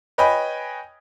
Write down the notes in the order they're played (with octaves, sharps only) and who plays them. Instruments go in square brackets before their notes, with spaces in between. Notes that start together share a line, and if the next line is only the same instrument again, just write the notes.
[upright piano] B4 C#5 D#5 G5 G#5 B5